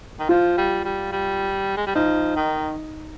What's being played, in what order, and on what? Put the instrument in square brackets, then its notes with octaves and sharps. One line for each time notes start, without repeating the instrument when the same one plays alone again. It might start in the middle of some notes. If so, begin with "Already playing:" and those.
[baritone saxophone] D#3
[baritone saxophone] F3 [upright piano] F4
[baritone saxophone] G3
G3
G3
G#3
G3
[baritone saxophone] F3 [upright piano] D#4
[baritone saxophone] D#3